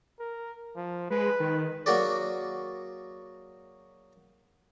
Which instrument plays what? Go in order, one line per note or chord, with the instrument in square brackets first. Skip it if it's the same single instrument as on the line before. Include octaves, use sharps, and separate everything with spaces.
[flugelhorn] A#4
F3
[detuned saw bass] G#3 [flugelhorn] B4
[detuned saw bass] D#3
[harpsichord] F#3 A#3 F#4 G#4 D5